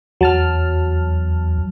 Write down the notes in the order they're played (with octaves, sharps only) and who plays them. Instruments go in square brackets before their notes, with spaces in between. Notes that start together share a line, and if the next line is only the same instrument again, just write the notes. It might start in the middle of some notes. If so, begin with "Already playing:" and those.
[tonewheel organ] E2 [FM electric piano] F#3 A5 F6